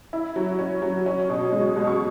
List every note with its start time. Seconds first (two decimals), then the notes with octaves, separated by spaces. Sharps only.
0.13 E4
0.36 F#3
0.59 C#4
0.82 F#3
1.06 C#4
1.30 B2
1.52 G#3
1.76 B2
1.87 C#6